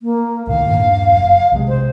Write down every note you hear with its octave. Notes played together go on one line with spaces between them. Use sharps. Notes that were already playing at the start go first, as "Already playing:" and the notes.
A#3
C2 A2 D#3 F5
D#1 G2 A#3
F#1
B1 C3 G#3
C5